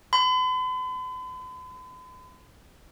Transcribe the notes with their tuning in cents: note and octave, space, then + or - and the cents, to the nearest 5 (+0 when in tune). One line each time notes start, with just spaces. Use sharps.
B5 +45